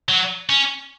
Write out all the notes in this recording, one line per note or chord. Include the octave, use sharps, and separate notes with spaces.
F#3
C#4